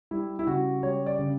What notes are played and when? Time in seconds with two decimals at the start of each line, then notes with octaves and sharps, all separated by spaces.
0.11 G3 E4
0.39 E4
0.47 C#3 F#4
0.83 G3 C#5
1.06 D5
1.19 C#3